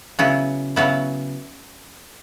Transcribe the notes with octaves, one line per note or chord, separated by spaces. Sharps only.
C#3 F#3 B3 E4
C#3 F#3 B3 E4